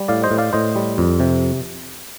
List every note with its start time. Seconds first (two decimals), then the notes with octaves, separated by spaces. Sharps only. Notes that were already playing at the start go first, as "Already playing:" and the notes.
Already playing: G3
0.08 A2 D5 F5
0.23 C5 D#5
0.31 A2
0.38 D5 F5
0.53 A2 C5 D#5
0.76 G3
0.98 F2
1.20 C3